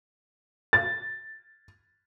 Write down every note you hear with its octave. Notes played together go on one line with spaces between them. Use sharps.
A6